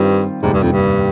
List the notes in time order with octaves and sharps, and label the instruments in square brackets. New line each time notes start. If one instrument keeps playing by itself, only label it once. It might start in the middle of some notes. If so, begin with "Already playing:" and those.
Already playing: [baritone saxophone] G2 [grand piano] D#3 G3 C4 F4
[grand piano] F1 D#2 D3 G3 D4 [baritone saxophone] G#2
[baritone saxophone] G2
F2
G2